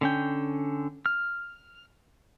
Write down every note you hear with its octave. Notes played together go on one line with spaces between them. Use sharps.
D3 C#4 G5
F6